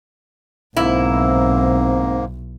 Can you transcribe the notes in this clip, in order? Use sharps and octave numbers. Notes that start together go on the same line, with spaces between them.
B1 G#2 A#3 C4 E4